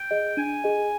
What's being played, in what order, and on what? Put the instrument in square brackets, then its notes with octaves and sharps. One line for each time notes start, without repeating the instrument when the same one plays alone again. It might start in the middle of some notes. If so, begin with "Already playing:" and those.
Already playing: [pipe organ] G5
[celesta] G#4 D#5
[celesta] D4 [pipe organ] G#5
[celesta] G#4 D#5